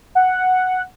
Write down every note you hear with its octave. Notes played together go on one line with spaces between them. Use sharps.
F#5